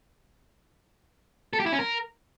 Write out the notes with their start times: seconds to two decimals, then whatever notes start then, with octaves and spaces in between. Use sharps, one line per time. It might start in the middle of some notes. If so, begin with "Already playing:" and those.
1.53 A4
1.60 G4
1.66 E4
1.72 C#4
1.79 A#4